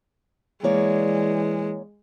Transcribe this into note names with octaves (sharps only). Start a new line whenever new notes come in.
E3 G#3 A#3 C#5 D5